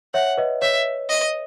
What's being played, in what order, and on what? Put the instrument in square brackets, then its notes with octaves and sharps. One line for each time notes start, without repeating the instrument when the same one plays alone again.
[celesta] C#5 E5 [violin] F#5
[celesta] B4 D#5
[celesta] C#5 [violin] E5
[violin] D#5